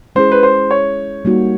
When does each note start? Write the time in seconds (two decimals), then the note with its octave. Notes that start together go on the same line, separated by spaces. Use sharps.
0.16 G#3 C#4 E4 G#4 C5
0.32 B4
0.43 C5
0.71 C#5
1.25 G3 A#3 D#4 F#4